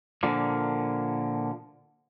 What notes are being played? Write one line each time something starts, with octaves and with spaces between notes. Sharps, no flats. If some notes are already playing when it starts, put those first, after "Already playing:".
A#2 D3 F3 A#3